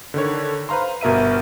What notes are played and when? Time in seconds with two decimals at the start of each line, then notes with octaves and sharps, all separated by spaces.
0.14 D3 D#3 C#5
0.69 B4 C5 F5 A#5 C6
1.01 G1 B2 A#4 E5 D#7